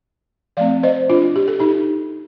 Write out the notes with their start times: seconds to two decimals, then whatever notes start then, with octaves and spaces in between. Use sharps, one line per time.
0.57 F3 A3 C4 D5 F5
0.83 C5 D#5
1.09 D4 F4
1.36 G4
1.48 A4
1.60 D#4 G4